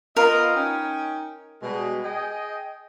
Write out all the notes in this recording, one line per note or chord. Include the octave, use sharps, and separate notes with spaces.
B3 F4 A#4 D#5
C#4 D#4 G5
B2 G3 G#3
G#4 D#5 G5